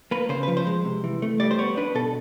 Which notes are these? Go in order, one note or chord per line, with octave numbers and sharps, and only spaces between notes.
A#3 B4
C#3 C5
F3 B4
C5
G#3
C3
E3
A3
G3 D5
C5
B3 C#5
D4 B4
B2 A4